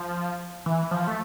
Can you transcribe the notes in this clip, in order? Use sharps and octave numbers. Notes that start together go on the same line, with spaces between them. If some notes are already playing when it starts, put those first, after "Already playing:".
Already playing: F3
E3
F3
A3